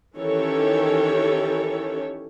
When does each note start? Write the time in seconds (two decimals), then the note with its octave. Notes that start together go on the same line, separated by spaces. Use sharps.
0.17 D#3 E3 C#4 G4 A4 C#5